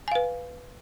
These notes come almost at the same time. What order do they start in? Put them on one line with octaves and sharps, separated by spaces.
G#5 F5 B4